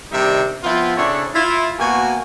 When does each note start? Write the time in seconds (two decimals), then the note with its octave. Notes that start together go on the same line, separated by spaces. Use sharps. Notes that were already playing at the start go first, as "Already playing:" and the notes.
0.11 C3 D#3 G3 D4 D#4 E5
0.63 F3 B3 C4 E4 F4
0.97 C#3 C4 D4 E4 A4 C#5
1.34 E4 F4
1.78 B2 A#3 F#4 G#5